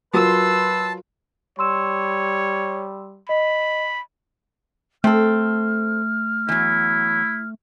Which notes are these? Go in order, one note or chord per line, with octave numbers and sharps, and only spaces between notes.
F#3 F4 A#4 B4 A5 C6 E6
G3 C#5 C6 E6 E7
D#5 B5
A3 C4 A4 F6
E2 F#3 E4